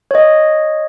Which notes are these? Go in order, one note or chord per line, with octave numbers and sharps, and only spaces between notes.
C#5 D#5